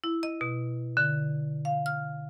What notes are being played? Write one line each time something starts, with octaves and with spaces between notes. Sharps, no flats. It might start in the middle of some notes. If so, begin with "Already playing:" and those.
E4
D#5
B2
D3
F5
F6